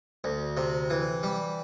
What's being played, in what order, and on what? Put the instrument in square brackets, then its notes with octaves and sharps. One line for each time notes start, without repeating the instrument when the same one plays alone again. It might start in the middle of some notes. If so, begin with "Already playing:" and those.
[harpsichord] D2
C3
E3
G3